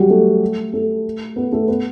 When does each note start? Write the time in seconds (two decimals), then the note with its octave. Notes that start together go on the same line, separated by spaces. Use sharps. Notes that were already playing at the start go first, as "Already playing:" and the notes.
Already playing: F#3 G3 F#4 G4
0.09 A3 A4
0.73 A3 A4
1.36 B3 B4
1.52 A3 A4
1.68 B3 B4